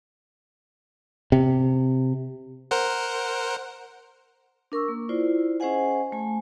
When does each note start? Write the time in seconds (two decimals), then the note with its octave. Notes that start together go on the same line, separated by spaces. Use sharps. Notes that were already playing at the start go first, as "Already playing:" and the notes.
1.32 C3
2.71 A#4 C5 F#5
4.72 D4 A#4 C#6 E6
4.88 A#3
5.09 E4 F4 C5 D5
5.60 C#4 G#4 C5 D#5 F#5 G#5
6.12 A3 G#5